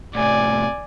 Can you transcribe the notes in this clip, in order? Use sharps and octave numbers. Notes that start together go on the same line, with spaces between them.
A2 C3 D5 G#5